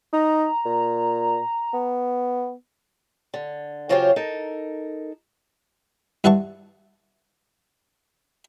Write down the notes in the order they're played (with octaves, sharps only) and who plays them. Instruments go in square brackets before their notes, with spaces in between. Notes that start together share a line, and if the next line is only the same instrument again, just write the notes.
[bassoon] D#4 [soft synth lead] A#5
[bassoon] A#2
B3
[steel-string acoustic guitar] D3
C#3 F#3 F4 G4 C5 C#5
D#4 A4 A#4
[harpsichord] G2 E4 F#5 A5 C#6